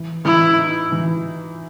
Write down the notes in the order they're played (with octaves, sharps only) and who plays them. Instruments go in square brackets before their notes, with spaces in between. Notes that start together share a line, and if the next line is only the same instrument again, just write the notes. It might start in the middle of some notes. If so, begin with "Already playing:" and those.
Already playing: [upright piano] E3
[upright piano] E3 [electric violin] E4
[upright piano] D#4
E3